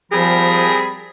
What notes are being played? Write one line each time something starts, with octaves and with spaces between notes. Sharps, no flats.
F3 G3 C4 G#4 A#4 B5